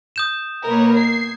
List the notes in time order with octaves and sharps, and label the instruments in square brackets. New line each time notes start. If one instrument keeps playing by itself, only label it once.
[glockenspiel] D#6 G6 E7
[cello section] B2 A#3 [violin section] A#4 B4 C#5
[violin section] G#6 C7